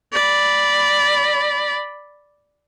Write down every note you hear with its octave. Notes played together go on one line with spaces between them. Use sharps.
D5 B5